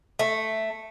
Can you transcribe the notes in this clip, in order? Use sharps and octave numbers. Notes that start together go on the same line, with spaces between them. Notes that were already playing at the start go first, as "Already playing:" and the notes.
A3